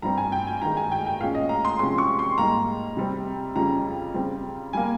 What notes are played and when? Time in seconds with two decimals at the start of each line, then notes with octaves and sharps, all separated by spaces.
0.02 G2 G3 C4 A#5
0.18 G#5
0.32 G5
0.47 G#5
0.62 G2 D#3 G#3 A#5
0.77 G#5
0.92 G5
1.06 G5
1.20 A#2 G#3 C#4 F5
1.35 D#5
1.49 A#5
1.65 C6
1.79 C3 F3 G#3 C#4 C6
1.98 C#6
2.19 C6
2.38 G#2 G3 A#3 A#5
2.97 C3 G3 C4
3.55 F2 C#3 G3 C#4 A#5
4.14 C#3 G3 C4
4.73 G3 A#3 G#5